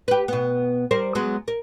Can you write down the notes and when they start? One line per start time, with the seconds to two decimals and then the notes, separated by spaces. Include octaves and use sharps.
0.08 G4 B4
0.28 B2 B3
0.91 G3 A#4 C5
1.15 F#3 G#3 B3
1.48 A#4